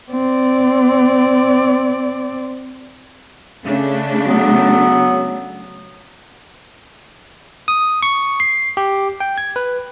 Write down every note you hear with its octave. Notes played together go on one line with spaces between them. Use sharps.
C4 D5
C#3 A3 D4
F#3 B3
D#6
C#6
C7
G4
G5
G#6
B4